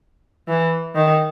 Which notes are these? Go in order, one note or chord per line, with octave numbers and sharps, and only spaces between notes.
E3
D#3